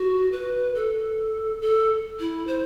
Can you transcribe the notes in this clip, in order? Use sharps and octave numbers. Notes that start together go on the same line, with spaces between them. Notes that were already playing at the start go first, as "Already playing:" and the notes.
Already playing: F#4
B4
A4
A4
E4
C5